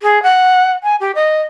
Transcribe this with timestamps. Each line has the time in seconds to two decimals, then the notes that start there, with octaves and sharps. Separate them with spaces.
0.02 G#4
0.23 F#5
0.83 G#5
1.00 G4
1.15 D#5